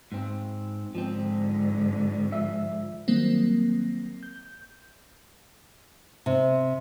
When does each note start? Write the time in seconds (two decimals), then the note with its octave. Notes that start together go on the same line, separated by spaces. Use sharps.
0.12 G#2 C4
0.95 G#2 D3 F3 C4
2.32 F3 E5
3.08 D#3 F#3 G3 A#3 C4
4.23 G6
6.26 C3